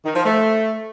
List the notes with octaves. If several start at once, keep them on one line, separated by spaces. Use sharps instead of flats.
D#3
F3
A3